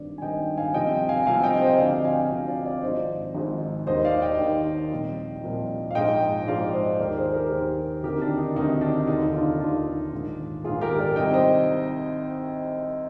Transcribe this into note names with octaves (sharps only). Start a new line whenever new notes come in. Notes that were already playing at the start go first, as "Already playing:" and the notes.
Already playing: G#1 G2 D#3 D5
G#5
G#1 G2 D#3 D#5 G5
F5 G#5
C2 C3 F3 D#5 G5
F5 G#5
C2 C3 F3 F5 G#5
D#5 G5
C5 D#5
D2 C3 F3 D5 F5
D#5 G5
F5 G#5
F5 G#5
D2 C3 F3 F5 G#5
D5 F5
D5 F5
G#1 G#2 F3 C5 D#5
G#1 G#2 F3
D#2 D#3 C5 D#5
D5 F5
D#5 G5
D#2 D#3
C2 A#2 F3
C2 A#2 F3
F5
A#1 G#2 F3 D#5 G5
A#1 G#2 F3 D5 F5
C5 D#5
D#2 D#3 A#4 D5
G#4 C5
G4 A#4
D#2 D#3 G#4 C5
D2 C3 D#3 G4 A#4
D4
D#4
D2 C3 D#3 D#4
D4
F1 D#2 D3 D#4
D4 F4
F1 D#2 D3 D4 F4
A#1 G#2 D#3
A#1 G#2 D#3 F4 G#4
G4 A#4
A#4 D5
C2 C3 D#3 D#5 G5
C5 D#5